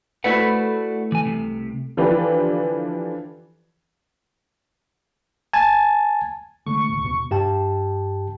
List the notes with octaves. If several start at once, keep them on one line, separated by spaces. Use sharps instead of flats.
A3 E4 F#4 B4 D5 F#5
E3 G#5
C2 F2 C3
D3 E3 F3 D4 G4 B4
G#5 A5
D3 G#3 A3 C#6
A1 D2 B2
D#2 B2
G2 G4 G5 A5